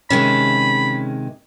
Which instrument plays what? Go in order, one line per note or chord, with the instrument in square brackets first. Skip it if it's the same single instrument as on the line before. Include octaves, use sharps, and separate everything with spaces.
[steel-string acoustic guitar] C3 D#3 G#3 [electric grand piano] C#4 [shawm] B5